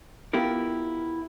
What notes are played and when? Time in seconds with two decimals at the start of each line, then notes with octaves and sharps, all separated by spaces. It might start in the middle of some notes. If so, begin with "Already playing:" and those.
0.33 B3 E4 F4 G4 A#4